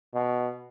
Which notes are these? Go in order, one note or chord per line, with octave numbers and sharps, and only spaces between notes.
B2